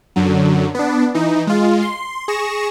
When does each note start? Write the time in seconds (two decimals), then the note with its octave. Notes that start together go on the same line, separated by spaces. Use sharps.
0.16 F#2 D3 F#3
0.75 B3 D4
1.15 E3 D#4
1.47 G#3 F4
1.82 C6
2.28 G#4 C#6 A#6 E7